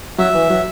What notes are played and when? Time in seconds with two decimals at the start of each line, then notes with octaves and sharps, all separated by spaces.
0.18 F#3 E5
0.35 E3
0.50 F#3